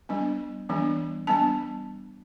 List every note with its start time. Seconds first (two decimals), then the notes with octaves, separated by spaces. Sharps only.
0.09 G3 B3 D4
0.69 E3 G3 B3 D4
1.27 G3 B3 D4 A5